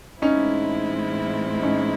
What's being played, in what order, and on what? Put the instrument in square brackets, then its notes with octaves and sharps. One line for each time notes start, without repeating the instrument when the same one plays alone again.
[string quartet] A2 E3 G#3 C4 E4 [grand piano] C#4 D#4
[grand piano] C#4 D#4